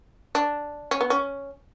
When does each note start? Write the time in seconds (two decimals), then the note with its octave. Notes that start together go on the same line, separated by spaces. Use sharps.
0.35 D4
0.91 C#4
1.01 B3
1.10 C#4